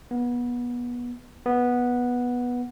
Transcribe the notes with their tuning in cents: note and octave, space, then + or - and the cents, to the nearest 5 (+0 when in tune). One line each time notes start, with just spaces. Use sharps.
B3 -25
B3 -10